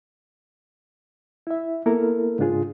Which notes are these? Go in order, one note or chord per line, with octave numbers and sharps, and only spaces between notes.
E4 E5
A#3 B3 E4 A4 A#4
G#2 C#3 D4 F4 G#4